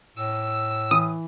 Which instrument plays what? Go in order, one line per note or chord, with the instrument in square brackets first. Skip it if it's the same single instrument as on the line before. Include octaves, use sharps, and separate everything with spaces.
[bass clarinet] A2 [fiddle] E6
[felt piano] E3 [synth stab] D#6